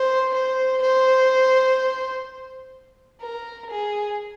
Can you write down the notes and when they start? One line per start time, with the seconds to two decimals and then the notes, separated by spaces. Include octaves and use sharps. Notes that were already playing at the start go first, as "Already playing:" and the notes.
Already playing: C5
0.34 C5
0.82 C5
3.21 A#4
3.69 G#4